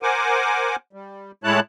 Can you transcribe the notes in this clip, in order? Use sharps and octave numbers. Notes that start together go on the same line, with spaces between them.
A#4 C5 F#5 G#5 D6
G3
A2 G#3 E4 C#5 A5 F#6